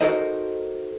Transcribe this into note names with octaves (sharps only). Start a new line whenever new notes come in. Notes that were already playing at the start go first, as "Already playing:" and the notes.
D#4 F#4 A4 A#4 C5 D#5